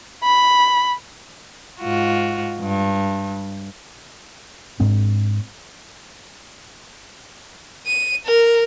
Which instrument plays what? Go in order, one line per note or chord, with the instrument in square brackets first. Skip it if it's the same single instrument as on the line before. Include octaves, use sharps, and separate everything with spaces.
[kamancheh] B5
[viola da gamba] G#2 F4 F#4
G2
[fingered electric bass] G#2 G#3 C4 D4
[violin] D#7
A#4